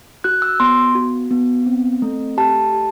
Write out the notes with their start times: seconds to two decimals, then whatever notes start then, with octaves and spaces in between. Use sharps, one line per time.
0.24 F#4 F#6
0.42 E6
0.60 B3 C6
0.95 F#4
1.31 B3
1.66 C4
2.02 A3
2.38 G4 A5
2.73 G4